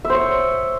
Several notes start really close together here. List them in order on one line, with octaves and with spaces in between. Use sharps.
E5 C5 C#5